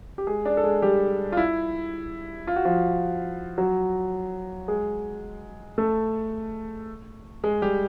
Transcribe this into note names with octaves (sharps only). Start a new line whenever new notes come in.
G4
G#3 G#4
D4 D5
A4
G#3 G#4
G3 G4
F4
E4
F4
F#4
F3 F4
F#3 F#4
G#3 G#4
A3 A4
G#3 G#4
G3 G4